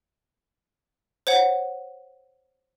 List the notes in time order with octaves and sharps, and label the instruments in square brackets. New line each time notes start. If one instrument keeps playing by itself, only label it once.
[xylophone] C5 C#5 F#5